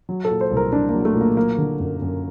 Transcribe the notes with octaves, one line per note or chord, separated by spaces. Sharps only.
F#3
A4
A#2
C5
C2
A#4
C2 D4
F#3 A#3
A3
A#2
A#3
F#3 A#3
D3
F#2
F#2